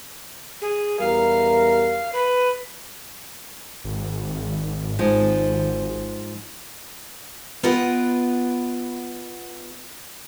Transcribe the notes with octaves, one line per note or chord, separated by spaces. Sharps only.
G#4
E2 G3 A#4 F5
B4
G#1
G#2 F3
B3 F4 B4 D#5 F#5 G5